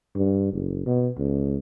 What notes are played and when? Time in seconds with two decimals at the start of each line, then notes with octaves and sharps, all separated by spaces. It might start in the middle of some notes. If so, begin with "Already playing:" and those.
0.15 G2
0.52 F#1
0.86 B2
1.17 C#2